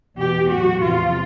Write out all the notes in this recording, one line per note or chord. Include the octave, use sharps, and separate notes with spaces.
E2 B2 G#3 G4
A2 F#3 F#4
E2 C3 F3 G#3 F4